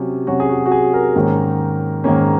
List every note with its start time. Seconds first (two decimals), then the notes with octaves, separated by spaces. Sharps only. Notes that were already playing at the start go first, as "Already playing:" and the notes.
Already playing: C3 F#3 C#4
0.27 C3 F#3 C#4 F#4
0.40 G#4
0.49 F#4
0.66 F#4
0.72 G#4
0.93 A#4
1.16 G#2 D#3 A#3 C#4
2.04 G#2 D#3 A#3 C#4